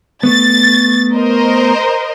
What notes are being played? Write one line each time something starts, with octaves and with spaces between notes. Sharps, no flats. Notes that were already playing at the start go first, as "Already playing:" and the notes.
A3 B3 A6
A#4 C5 D#5